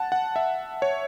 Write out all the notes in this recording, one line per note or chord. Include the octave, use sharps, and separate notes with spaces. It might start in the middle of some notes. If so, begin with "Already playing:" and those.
Already playing: F#5 A5
F#5
E5
C#5